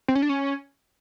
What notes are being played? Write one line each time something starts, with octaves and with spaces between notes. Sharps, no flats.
C4
C#4
D4
C#4